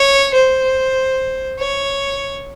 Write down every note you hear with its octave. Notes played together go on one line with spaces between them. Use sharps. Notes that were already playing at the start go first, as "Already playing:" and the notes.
Already playing: C#5
C5
C#5